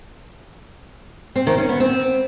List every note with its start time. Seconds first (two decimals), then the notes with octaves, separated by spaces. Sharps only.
1.36 C4
1.47 D#3
1.58 C#4
1.69 B3
1.80 C4